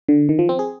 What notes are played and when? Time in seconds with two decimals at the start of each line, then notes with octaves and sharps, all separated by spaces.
0.09 D3
0.29 D#3
0.39 F3
0.49 C4
0.59 G#4